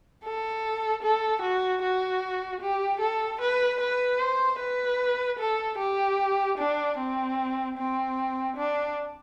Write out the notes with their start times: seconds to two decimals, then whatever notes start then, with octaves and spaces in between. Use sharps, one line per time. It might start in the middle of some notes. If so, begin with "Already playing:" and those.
0.24 A4
1.03 A4
1.42 F#4
1.82 F#4
2.61 G4
3.00 A4
3.41 B4
3.80 B4
4.19 C5
4.59 B4
5.39 A4
5.78 G4
6.58 D4
6.98 C4
7.77 C4
8.56 D4